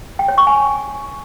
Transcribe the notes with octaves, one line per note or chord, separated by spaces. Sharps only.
G5
C#5
C#6
G#5